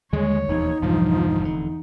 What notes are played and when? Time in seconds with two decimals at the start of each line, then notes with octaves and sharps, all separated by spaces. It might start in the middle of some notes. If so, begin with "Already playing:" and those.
0.13 D#2 D3 G3 G#3 C#5
0.49 E1 D#2 F3 D#4
0.82 B1 E2 G2 D3 F3
1.41 F1 D3